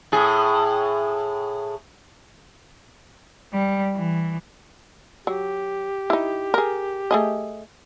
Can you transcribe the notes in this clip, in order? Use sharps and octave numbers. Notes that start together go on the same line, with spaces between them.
A2 G#4
G3
E3
F#3 G4
D#4 E4
G#4 A#4
A3 G#4 D#5